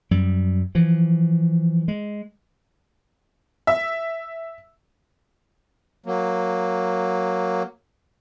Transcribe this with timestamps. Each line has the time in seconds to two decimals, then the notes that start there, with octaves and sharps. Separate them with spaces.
0.11 F#2 G3
0.75 E3 F3
1.88 G#3
3.67 E5
6.06 F#3 A#3